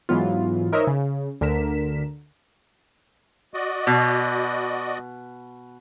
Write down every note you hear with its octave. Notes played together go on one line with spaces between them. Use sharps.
G#2 E3 F#3 B3 F4
D#4 A#4 C5 C#5 D#5 E5
C#3
D2 D3 A#4 B6 E7
F#4 D5 D#5
B2